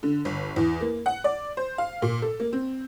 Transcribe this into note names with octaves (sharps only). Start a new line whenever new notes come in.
D3
G1
E2
A#3
F#5
D5
C5
F5
A#2
A4
A#3
C4